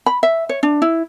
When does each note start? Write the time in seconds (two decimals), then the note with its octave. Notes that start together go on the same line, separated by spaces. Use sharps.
0.06 B5
0.23 E5
0.49 C#5
0.63 D4
0.82 E4